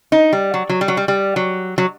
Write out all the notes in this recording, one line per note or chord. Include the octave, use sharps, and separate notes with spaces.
D#4
G3
F#3
F#3
G3
F#3
G3
G3
F#3
F#3